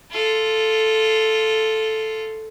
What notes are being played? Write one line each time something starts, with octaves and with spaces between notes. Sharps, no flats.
F4 A4